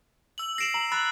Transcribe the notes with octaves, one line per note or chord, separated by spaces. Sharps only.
E6 F#7
A#6 C7 D7 E7 F#7
A#5 E6 F#7
B5 E6 F#6 A6